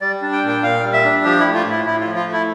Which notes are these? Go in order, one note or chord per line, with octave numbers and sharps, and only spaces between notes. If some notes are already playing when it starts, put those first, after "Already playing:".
G3 D5
D4
G5
A#2
G5
A#2 F5
G3
E5
D4
F3 G4
E4
A3
F4
A2 E4
A2 E4
F4
F3
F4
A3
E4